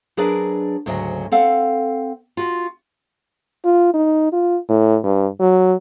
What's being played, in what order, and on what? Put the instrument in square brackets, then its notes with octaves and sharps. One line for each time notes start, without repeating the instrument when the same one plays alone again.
[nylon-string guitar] F#3 D4 G#4 A#4 B4 D5
D2 G#2 C#3 F#3 D#5
C4 A4 F5 F#5
F4 F#4
[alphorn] F4
D#4
F4
A2
G2
F#3